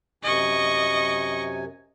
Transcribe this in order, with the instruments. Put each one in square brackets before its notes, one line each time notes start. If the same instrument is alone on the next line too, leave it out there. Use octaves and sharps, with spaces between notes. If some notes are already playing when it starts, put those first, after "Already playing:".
[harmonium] F#2 C3 G#5 [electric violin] D#5 C#6